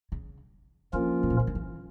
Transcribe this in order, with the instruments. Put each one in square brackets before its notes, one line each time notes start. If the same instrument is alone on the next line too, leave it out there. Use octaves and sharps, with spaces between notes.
[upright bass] C#3
[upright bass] D3 [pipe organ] F3 A#3 C#4 F4 A#4
[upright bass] A2
A#2
C#3
D3
E3